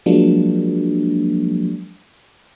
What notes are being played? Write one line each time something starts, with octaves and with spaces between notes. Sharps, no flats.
F3 F#3 G#3 A#3 D4